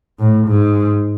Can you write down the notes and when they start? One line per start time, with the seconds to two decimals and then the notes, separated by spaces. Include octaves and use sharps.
0.20 A2
0.47 G#2